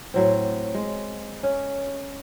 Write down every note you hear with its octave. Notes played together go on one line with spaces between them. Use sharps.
A2 F#3 C4
G#3
C#4